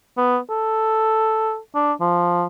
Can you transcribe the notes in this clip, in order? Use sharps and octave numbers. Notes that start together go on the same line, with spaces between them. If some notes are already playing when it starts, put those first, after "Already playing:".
B3
A4
D4
F3